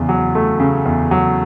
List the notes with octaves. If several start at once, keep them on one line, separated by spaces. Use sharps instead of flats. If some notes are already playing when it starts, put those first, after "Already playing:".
Already playing: E2 C#3
F#3
A3
C#3
E2
F#3